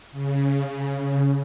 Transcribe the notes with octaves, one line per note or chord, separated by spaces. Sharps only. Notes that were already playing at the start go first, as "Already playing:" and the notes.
C#3